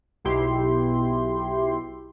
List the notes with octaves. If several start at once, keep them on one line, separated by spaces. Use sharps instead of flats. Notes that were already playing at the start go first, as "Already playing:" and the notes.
B1 B2 E4 G4 C6